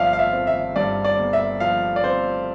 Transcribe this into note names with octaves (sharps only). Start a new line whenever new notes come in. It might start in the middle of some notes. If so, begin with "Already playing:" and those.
Already playing: G1 G2 F3 D5 E5 F5
F5
E5
C4
E5
G2 D5
D5
G1
E5
F3 F5
D5
C4 C5